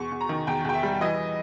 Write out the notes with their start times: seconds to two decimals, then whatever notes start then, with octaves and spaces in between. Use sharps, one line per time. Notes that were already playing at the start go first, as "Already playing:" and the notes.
Already playing: E2 C#6
0.11 E2
0.21 A#5
0.29 D#3
0.47 E2 G5
0.65 E2 G5
0.74 E5
0.83 G3
1.01 E3 D#5